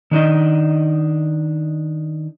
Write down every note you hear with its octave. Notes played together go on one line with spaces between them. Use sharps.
D#3 D4 D#4 D#5